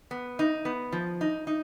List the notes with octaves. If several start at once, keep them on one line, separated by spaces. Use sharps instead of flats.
B3
D#4
B3
F3
D#4
D#4